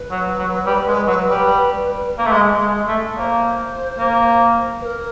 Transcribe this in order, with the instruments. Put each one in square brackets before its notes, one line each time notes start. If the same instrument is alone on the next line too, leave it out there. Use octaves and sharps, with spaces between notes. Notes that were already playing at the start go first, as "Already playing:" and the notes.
Already playing: [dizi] B4
[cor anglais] F#3
F#3
G3
G#3
F#3
G3
A#3
A3
G#3
G#3
A3
[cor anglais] A#3 [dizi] C5 D5
[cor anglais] A#3
[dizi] B4
A#4